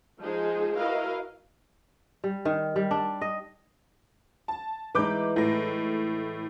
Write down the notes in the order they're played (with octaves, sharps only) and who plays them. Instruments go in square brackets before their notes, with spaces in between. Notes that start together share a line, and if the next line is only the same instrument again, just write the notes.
[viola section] F3 G#3 D#4 G#4 C5
E4 F#4 A#4 B4 D#5 F5
[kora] G3
D#3
G3
D4
D#5
[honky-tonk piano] A5
[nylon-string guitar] E3 G#3 D#4 [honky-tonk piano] B4 D6 G6
[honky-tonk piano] A2 A#6